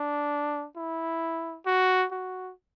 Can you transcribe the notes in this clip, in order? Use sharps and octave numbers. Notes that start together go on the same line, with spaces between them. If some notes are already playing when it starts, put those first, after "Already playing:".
Already playing: D4
E4
F#4
F#4